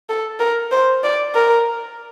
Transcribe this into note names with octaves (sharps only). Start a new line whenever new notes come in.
A4
A#4
C5
D5
A#4